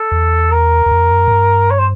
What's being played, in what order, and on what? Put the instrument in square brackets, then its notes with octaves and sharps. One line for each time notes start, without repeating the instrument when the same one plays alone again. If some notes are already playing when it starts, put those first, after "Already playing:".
Already playing: [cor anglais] A4
[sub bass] E2
[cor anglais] A#4
[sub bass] E2
F2
F#2
G#2
G2
[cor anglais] C#5
C5